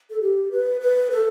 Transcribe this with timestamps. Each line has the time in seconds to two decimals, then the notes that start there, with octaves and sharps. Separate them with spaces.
0.10 A4
0.21 G4
0.52 B4
0.81 B4
1.11 A4